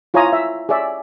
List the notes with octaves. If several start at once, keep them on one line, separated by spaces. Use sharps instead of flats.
E4 F4 C#5 G#5 A#5 D#6
E5
G#4 C#5 D5 E5